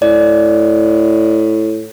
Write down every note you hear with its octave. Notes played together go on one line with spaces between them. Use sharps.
A2 D5